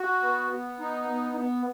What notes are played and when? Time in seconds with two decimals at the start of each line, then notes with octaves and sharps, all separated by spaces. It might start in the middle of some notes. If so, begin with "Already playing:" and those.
Already playing: F#4
0.22 B3
0.51 B3
0.80 D#4
1.08 B3
1.36 B3